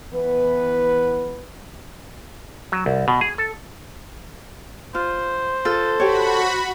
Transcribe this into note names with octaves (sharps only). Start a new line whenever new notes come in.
E3 B3 B4
F#3
C2
B2
G#4
A4
F4 C5
F4 A4
F#4 G4 C#5 B5